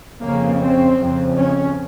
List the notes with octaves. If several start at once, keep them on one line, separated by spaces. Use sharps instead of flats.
F2 C#3 A#3
C4
F2 C#3
C#4